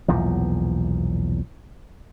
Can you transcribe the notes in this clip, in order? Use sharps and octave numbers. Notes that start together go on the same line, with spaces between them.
B1 E2 A#2 F3